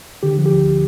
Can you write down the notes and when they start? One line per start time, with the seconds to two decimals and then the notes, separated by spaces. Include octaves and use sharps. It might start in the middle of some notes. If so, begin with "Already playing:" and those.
0.23 D3 G4
0.38 F3
0.46 G4
0.53 D2